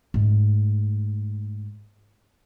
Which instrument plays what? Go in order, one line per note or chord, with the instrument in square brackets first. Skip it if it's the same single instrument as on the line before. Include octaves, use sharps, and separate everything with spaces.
[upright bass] G#2 A3